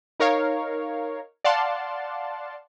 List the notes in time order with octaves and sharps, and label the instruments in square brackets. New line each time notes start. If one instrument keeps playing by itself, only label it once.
[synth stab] D#4 A#4 C#5 F5
D5 F5 F#5 A5 C6